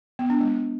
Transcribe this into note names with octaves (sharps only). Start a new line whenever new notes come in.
B3
D4
G#3